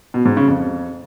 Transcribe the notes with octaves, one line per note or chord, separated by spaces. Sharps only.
B2
G#2
C#3
F2